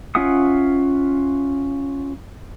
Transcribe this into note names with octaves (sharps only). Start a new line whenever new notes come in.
C#4 F4 E5 F#5 D#6